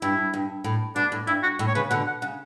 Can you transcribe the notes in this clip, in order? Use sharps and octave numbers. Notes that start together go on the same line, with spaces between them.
G2 E4
G2
A2
B2 D4
A2
G2 E4
F#4
A2
C#5
C#3 B4
B2 D3 F#5
F#5
C#3 F#5